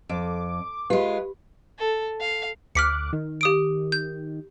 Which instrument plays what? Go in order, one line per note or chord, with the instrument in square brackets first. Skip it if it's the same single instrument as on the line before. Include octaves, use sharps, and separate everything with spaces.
[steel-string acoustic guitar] F2 [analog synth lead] D6
[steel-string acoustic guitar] G#3 F4 [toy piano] G4 [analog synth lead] B4
[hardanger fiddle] A4
F5
[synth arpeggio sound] D2 D6 F#6 [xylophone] F6 B6 C#7
[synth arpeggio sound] D#3
[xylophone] G4 D#6 D7
G6